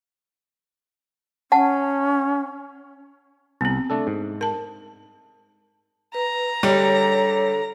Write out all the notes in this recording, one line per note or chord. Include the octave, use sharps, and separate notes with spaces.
C#4 F#5 A5
C2 B3 C4
A3 D4 A4
G#2
A#4 A5
B4 A#5
D3 G3 G#3 C#5